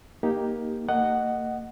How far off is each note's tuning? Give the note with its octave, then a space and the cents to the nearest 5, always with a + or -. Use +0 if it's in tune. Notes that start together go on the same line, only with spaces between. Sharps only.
A#3 +10 D#4 +0 G4 +0
A#3 -40 D#5 -15 F#5 +5